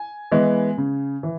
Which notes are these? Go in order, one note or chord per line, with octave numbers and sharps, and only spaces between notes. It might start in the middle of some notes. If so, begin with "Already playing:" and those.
Already playing: G#5
E3 G#3 B3
C#3
E3